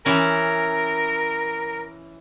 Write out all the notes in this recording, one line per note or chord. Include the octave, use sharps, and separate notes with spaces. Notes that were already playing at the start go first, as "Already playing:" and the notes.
E3 C#4 A#4